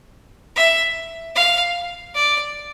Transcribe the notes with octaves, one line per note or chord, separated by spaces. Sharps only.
E5
F5
D5